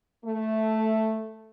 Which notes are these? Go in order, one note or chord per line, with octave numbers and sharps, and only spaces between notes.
A3